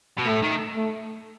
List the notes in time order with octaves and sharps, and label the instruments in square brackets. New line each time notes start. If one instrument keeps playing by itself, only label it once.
[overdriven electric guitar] B2
[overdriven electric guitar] A2 [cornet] A3
[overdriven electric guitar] D#3
[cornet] A3